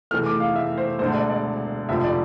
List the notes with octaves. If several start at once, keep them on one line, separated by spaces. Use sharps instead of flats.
F1 E2 E3 A3 F6
D6
F5
E5
C5
E1 D2 D3 C5
D5
D5
F1 F2 D3 F3 E5
D5